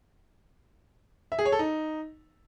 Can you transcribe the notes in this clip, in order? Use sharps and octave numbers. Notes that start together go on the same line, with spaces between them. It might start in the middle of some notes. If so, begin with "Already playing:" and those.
E5
G#4
C#5
A4
D#4